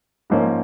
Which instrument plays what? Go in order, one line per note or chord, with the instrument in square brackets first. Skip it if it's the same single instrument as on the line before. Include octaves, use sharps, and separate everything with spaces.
[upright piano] G#2 F3 A#3 C#4